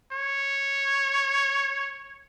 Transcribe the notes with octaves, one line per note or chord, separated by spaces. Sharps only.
C#5